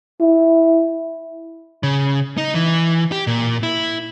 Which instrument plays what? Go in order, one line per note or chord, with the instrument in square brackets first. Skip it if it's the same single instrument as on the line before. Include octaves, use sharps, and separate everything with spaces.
[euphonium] E4
[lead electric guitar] C#3
D#4
E3
G4
A#2
E4